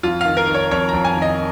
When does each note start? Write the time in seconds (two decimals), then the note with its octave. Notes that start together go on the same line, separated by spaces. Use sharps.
0.03 F2 F4
0.21 D#3 F5
0.37 A#4
0.48 D#3
0.54 C#5
0.71 F2 C#5
0.89 F2 A#5
1.05 G#5
1.17 D#3
1.22 D#5